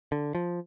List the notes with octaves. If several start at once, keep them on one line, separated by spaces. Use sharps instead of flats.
D3
F3